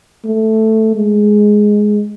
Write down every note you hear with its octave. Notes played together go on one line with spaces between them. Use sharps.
A3
G#3